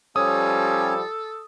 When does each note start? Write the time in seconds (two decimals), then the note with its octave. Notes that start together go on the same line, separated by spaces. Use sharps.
0.16 F3 G3 C#4 A4 C#5 D#6